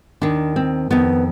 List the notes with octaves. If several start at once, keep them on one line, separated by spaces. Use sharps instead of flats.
D#2 D#3 D4
C4
F2 D#3 B3